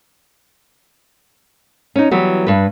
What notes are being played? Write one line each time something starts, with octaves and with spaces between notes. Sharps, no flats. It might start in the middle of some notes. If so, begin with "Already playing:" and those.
C#4 D#4
E3 F#3 G3 B3
G2 B4